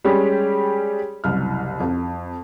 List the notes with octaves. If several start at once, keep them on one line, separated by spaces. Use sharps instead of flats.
G3 G#3 C#4 G4 G#4
F#1 C2 F6
F2